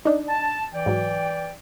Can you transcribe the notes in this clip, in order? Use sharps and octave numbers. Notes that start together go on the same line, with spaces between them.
D4 D#4
A5
E3 D5 G5
G#2 F#3